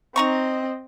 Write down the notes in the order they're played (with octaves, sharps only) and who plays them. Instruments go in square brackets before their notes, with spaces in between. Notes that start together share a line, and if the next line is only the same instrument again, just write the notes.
[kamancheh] C4 D#5 [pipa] D#4 A#5 C#6